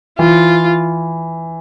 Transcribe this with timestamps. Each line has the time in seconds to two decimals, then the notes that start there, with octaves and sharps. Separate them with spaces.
0.18 E3 F4